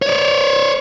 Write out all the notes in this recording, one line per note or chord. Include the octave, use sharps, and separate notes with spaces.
C#5 D5